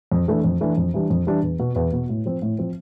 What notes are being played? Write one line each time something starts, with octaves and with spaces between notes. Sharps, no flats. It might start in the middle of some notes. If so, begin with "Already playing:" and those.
F2
E3 A3 D4
F2
E3 A3 D4
F2
E3 G3 D4
F2
E3 G3 D4
E2
B2 B3
E2
B2 B3
A2
F3 C4
A2
F3 C4